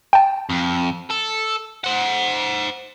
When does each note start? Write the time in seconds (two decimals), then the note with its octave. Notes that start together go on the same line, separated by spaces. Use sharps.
0.13 G5 A5
0.49 F2
1.10 A4
1.84 C5 F#5